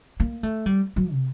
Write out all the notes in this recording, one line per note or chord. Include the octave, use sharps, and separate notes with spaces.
A#3
A3
G3
F#3
C3